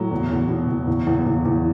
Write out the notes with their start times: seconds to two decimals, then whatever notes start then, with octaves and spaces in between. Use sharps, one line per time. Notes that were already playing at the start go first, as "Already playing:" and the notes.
Already playing: A2 F#3
0.11 E2
0.31 E2
0.49 B2
0.68 E2
0.87 E2
1.07 E2
1.26 E2
1.45 E2